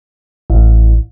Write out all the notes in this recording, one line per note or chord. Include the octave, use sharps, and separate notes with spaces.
A1